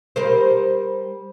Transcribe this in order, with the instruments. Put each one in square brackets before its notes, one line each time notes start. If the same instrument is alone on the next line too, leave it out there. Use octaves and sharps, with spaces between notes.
[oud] G3 A#4 C5